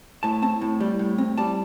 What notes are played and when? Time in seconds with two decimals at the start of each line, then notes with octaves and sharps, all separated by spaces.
0.23 A2 A5
0.42 C4 A5
0.61 A2
0.80 G3
0.99 A2
1.18 C4
1.37 G3 A5